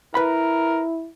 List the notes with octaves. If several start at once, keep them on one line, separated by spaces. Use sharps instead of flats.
E4 A#4 B4 B5